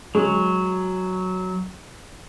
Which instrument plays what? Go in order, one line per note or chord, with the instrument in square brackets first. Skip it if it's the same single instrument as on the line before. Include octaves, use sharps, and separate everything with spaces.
[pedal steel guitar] F#3 [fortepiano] G#3